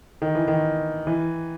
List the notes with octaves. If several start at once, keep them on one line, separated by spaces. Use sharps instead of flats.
D#3
E3
D#3
E3